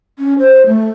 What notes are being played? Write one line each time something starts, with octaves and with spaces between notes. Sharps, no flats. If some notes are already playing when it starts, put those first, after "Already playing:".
C#4
C5
A3